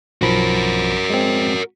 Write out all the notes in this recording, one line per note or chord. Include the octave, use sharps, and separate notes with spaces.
B1 F3 F#4 A#4 B5
G#3 C4